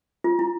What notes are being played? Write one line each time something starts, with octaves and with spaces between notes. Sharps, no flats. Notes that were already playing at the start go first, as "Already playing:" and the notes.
F4
E4